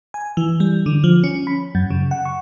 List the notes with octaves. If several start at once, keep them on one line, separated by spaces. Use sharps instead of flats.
G#5
E3
G3
D3
F3
C#4
B5
F#2
C#3
F#5
C#6